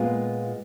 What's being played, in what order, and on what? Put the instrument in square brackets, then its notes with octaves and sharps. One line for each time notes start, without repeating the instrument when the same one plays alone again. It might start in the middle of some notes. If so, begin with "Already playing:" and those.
Already playing: [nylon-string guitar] A#2 G#3 B3 F4